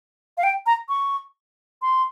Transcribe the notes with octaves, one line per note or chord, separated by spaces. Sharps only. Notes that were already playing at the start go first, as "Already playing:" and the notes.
F5
G5
A#5
C#6
C6